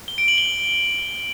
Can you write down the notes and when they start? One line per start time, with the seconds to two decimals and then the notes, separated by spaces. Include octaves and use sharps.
0.08 G7
0.18 D7
0.28 F#7
0.38 G7